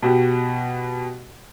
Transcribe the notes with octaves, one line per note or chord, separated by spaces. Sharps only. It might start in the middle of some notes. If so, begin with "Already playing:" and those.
B2 F#4 G4